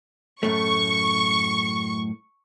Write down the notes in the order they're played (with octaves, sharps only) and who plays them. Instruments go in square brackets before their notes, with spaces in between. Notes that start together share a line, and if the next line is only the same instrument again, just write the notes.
[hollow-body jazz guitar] F#2 A2 A3 [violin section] C#6